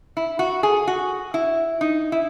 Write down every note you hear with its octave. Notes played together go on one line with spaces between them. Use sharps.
E4
F#4
G#4
F#4
E4
D#4
E4